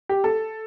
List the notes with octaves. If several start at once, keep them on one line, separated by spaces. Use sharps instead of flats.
G4
A4